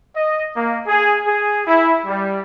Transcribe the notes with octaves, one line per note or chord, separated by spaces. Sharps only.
D#5
A#3
G#4
G#4
E4
G3